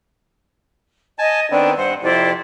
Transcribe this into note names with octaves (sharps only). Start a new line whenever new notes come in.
D#5 G#5 A5
D#3 B3 C4 D4
G2 C5 F#5
F2 C3 E4 C5 D5